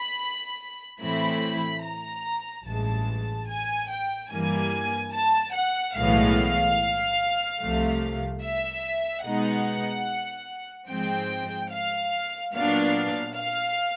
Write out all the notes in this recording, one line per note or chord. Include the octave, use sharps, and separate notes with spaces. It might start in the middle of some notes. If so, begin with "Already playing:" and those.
Already playing: B5
A2 E3 A3 C4 E4 B5
A#5
A1 G2 E3 G#3 A5
G#5
G5
G2 E3 G3 A#3 G#5
A5
F#5
B1 A2 E3 G#3 B3 F5
C2 C3 F3 A3
E5
B2 G#3 B3 D#4 F#5
G#2 F3 G#3 C4 G5
F5
A#2 F#3 B3 D4 F5
F5